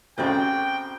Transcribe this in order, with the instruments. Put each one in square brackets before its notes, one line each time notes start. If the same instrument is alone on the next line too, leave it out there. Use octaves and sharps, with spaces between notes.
[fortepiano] A1 C#3 [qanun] C4 F#4 D5 [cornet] G5